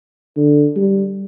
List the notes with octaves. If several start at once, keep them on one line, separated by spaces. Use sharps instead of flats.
D3
G3